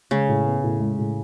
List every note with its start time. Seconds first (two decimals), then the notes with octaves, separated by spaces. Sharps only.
0.11 C#3 G#3
0.29 A2
0.46 B3
0.64 A2
0.80 G#3
0.98 A2